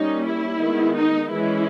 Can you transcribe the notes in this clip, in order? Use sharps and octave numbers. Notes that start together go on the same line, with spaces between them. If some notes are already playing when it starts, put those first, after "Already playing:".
Already playing: G3 A#3 C#4 D#4
E4
D#3 G#3 B3
D#4
E3 G#3 C#4 E4